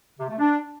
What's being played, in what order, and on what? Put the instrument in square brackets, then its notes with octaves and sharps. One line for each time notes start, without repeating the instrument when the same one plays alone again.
[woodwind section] C3
A3
D4